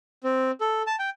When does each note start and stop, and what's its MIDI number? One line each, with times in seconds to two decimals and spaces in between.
0.24 0.51 60
0.61 0.82 69
0.87 0.96 81
0.99 1.10 79